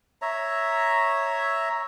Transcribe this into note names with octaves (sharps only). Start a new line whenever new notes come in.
C#5 E5 A#5